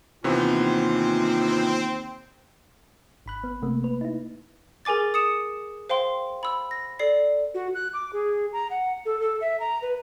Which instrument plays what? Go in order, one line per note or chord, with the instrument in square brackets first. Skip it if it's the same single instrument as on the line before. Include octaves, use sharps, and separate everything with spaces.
[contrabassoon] D#2 [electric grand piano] C3 E3 B3 [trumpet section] C4 [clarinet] F4
[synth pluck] G#1 B5 F#6
B3
C3 A3 A#3
B4
D#4 E4
[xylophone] G#4 A#4 G#5 D6 A6
D#6 C#7 E7
C5 F5 G5 C6
B5 E6
A#6
A4 D5 C7
[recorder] F#4
F#6
D6
G#4
A#5
F#5
A4
A4
E5
A#5
B4